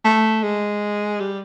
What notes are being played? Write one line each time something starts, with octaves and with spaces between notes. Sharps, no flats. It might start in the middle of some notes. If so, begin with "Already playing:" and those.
A3
G#3
G3